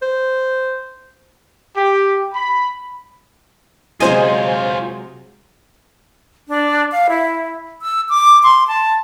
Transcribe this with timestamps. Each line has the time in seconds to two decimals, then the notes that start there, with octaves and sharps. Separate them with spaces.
0.02 C5
1.77 G4
2.34 B5
4.00 C3 F#3 G#3 F4 C5 C#5 D#5 G#5
6.48 D4
6.92 F5
7.09 E4
7.82 E6
8.09 D6
8.43 C6
8.68 A5